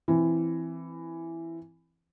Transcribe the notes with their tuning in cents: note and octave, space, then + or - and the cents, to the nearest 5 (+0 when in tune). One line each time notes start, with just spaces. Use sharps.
E3 +10 C4 +0